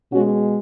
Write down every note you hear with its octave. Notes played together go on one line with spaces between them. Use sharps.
B2 G#3 C#4 F#4